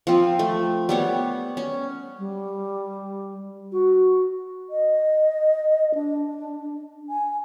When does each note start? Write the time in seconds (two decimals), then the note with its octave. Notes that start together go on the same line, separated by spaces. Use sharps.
0.07 F3 C4
0.39 A3
0.89 G3 B3 C#5
1.57 C#4
2.19 G3
3.72 F#4
4.70 D#5
5.95 D4
7.09 G#5